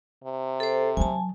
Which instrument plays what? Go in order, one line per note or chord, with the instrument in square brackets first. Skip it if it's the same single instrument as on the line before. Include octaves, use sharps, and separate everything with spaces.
[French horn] C3
[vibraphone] A4 C5
[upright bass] D#3 F#3 [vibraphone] G#5 A5